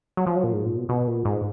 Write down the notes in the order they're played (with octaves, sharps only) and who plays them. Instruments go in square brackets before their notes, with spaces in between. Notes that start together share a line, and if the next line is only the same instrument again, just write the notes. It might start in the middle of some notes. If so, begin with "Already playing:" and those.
[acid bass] F#3
F3
F#3
A#2
G#2
A#2
B2
B2
A#2
G#2